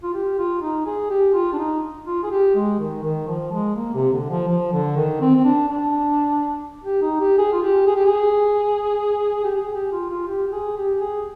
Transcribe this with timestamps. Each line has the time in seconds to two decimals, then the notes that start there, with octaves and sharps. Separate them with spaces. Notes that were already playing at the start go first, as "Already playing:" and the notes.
0.03 F4
0.14 G4
0.38 F4
0.62 D#4
0.86 G#4
1.10 G4
1.34 F4
1.53 D4
1.58 D#4
2.07 F4
2.23 G#4
2.31 G4
2.55 G#3
2.79 D#3
3.03 D#3
3.27 F3
3.52 G#3
3.76 A#3
3.94 C3
4.13 D3
4.30 F3
4.48 F3
4.72 D3
4.96 D#3
5.21 C4
5.35 C4
5.45 D4
5.69 D4
6.84 G4
7.02 D#4
7.20 G4
7.38 G#4
7.53 F4
7.62 G4
7.86 G#4
7.95 G4
8.05 G#4
9.44 G4
9.56 G#4
9.74 G4
9.92 F4
10.10 F4
10.27 G4
10.47 G4
10.52 G#4
10.77 G4
11.01 G#4